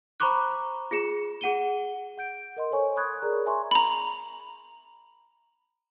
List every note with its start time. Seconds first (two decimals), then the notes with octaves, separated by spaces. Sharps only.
0.20 C5 A#5 B5 C#6 D6 F#6
0.91 F4 G#4 C#7 E7
1.41 G#4 F#5 D#7 G7
2.18 F#5 G6 D7
2.57 A#4 D#5 C6
2.71 A4 C5 C#5 G#5 C#6
2.96 B5 C#6 D#6 F#6 G#6
3.22 G#4 A#4 D5 A#5
3.46 E5 G#5 A#5 C6 C#6
3.71 A#5 B5